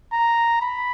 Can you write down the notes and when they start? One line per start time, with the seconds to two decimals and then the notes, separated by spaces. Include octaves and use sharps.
0.13 A#5
0.62 B5